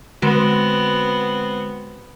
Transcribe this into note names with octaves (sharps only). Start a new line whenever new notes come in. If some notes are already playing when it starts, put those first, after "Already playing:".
D3 G#3 B3 C4 F#4